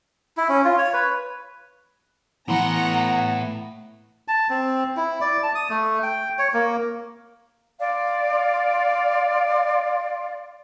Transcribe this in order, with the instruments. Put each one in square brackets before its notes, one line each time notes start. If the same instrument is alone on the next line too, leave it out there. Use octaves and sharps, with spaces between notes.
[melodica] E4
C#4
F4
C#5
B4
[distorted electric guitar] A2 C6 [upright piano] E3 [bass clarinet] B3 [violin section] F#5 A#5
[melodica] A5
C4
E4
D5
A5
D#6
A3
G5
C#5
A#3
[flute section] D5 F5 C6